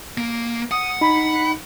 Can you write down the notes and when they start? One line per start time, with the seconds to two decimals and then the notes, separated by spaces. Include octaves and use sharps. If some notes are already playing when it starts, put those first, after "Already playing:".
0.18 A#3
0.71 F#5 D#6
1.01 D#4 B5